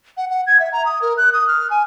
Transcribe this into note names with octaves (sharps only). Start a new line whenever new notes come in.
F#5
F#5
G#6
E5
A#5
D#6
A#4
F#6
D#6
F6
G#5